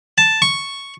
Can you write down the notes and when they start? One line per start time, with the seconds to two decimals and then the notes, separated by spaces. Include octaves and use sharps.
0.18 A5
0.42 C#6